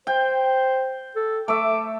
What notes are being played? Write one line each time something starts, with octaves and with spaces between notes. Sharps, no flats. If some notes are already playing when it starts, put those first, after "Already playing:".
C5 G5
A4
A3 E5 D6